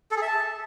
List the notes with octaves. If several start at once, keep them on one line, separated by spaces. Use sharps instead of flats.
A4
G#4
E5
A5